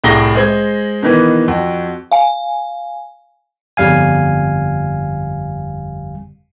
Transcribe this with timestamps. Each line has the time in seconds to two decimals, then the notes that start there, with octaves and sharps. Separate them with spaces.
0.04 C2 A2 G#4 A#6 G7
0.35 G#3 C5 G#6
1.02 B2 D#3 E3 B3
1.48 F2 F#4
2.12 F5 G#5
3.77 G1 F2 G3 F5 G#5